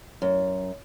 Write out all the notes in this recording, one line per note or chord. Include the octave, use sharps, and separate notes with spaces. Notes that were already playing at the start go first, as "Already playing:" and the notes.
F#2